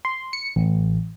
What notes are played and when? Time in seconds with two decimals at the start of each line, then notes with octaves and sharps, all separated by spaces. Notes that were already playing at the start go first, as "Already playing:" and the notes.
0.05 C6
0.33 C#7
0.56 A1